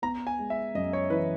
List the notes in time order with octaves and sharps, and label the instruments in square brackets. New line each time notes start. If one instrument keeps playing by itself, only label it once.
[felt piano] B3 [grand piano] A#5
[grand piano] G#5
[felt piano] G#3
[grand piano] E5
[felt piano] F#2 [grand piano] D#5
[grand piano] C#5
[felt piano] E3 [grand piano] B4